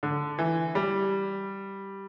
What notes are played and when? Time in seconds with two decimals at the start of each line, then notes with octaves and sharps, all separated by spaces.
0.03 D3
0.39 E3
0.75 G3